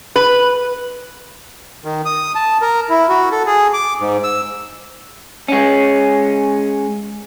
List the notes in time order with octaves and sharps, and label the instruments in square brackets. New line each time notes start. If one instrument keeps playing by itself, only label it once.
[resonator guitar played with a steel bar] B4
[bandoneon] D#3
D#6
A5
A#4
E4
F#4
A4
G#4
D6
G#2
E6
[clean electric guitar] G#3 C#4